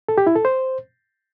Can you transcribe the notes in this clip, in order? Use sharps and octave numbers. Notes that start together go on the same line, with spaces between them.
A4
G4
E4
A4
C5